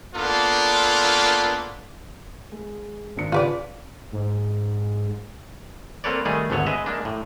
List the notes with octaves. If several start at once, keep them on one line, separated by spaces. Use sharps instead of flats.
A#3 B3 D4 F4 A4
G#3
G#1 D4 C#7
C#3 F4 B4 D5
G#2
A#3 C4 A4 B4 C#5 D5
D#3 G3 A3 G#4
G#1 D2 D3 B3 C#5
G#3 B4 D#5 E5
G#3 A#3 D4
A2